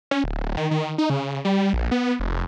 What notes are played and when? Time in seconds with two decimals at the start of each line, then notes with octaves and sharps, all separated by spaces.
0.11 C#4
0.24 D1
0.57 D#3
0.71 D#3
0.98 D#4
1.10 C#3
1.45 G3
1.73 A#1
1.91 B3
2.20 F1